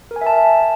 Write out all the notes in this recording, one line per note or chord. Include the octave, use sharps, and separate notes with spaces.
A#4
G#5
E5
A5